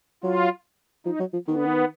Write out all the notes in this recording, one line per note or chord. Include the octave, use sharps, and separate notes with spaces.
F#3 F4
F3 D#4
F#3
F3
D#3 B3
D3
D#3